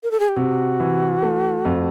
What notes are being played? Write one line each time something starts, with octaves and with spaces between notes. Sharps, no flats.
A#4
A4
G#4
G4
C3 F#4
E3
A3
F2